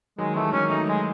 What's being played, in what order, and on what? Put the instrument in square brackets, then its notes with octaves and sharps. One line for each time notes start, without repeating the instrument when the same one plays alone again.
[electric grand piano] D#3 F#3 [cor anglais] G#3
[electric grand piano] E3 G#3 [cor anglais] A3
[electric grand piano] D#3 F#3 [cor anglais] C#4
[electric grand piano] F#3 A3 [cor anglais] D#4
[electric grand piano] F#3 A3 [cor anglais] G#3